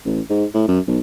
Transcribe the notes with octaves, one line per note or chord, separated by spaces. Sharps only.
A1
G#2
A2
F#2
B1